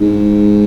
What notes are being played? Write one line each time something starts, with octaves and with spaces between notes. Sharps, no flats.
G#2